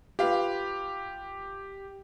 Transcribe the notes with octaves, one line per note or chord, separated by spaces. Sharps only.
F4 G4 B4 F5